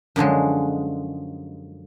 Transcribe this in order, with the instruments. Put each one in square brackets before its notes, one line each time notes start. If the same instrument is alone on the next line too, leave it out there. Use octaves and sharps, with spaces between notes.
[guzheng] F#2 D3 F3 G#3